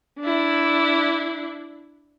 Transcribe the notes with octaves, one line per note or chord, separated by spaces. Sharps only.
D4 E4